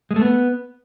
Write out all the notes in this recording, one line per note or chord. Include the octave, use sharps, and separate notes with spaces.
G#3
A3
B3